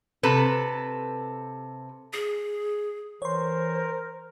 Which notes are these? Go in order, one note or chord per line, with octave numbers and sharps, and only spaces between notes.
C3 A4 B4
G#4
E3 A#4 C5 C#5 C6